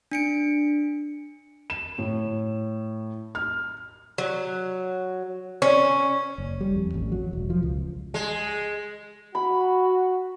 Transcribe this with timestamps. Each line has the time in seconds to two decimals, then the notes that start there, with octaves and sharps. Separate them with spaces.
0.12 D4 C#7 D7
1.70 E7
1.98 A2
3.35 F6
4.18 F#3
5.62 C#4
6.38 F#1
6.61 G3
6.76 F2
6.94 A1
7.12 F#3
7.33 E1
7.50 F3
7.63 C#2
8.14 G#3
9.35 F#4 B5